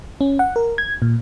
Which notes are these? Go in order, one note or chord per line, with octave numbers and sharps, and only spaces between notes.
C#4
F#5
A#4
G#6
A#2